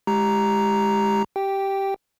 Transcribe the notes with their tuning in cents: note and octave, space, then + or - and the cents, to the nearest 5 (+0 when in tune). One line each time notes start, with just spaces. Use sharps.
G#3 +0 G4 +0 A#5 +0
G4 -10 G5 +0